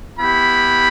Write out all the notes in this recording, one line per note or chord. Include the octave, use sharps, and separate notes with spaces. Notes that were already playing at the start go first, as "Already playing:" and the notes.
B3 E4 G4 B5